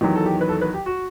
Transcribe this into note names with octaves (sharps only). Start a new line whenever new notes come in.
E2 D#3 F#3 G4
A4
G4
B4
A4
B4
G4
F#4